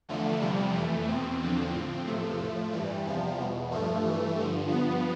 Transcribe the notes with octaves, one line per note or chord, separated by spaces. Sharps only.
E2 D3 F3 A3
E2 C3 F3 G3
F2 E3 A3
E2 B2 C4
E2 D3 F3
A2 F3 C4
E2 C3 F3 A3
A2 F3
G2 E3 G3
E2 C3 F3
E2 B2
G2 F3 A3
G2 E3
G2 D3 F3
G2 F3 B3